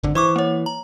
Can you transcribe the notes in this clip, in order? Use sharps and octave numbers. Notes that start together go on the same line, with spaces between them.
G#1 D3
E3 C5 C#6 D6
A#3 C#5
A#5